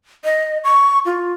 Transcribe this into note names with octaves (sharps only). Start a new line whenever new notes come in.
D#5
C#6
F4